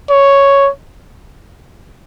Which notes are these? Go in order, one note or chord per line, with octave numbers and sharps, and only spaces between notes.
C#5